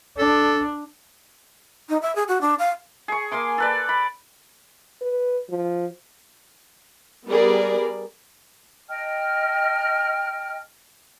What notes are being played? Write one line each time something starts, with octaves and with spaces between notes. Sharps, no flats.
D4 A4
D#4
E5
G#4
F#4
D4
F5
G#4 C#6
A#3 G#5 C6 D6
A4 B4 D5
B5
B4
F3
G3 B3 G#4 A#4 B4 D5
D#5 G5 A5 F6